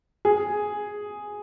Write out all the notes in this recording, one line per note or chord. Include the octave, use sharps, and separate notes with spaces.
G#4